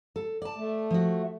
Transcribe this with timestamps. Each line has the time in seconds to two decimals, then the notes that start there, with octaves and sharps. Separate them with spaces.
0.16 A4
0.42 D5 A5
0.57 A3
0.91 F3 F#4